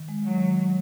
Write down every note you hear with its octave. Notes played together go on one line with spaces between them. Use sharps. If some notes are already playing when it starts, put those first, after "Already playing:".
Already playing: D#3
G#3
F#3
D#3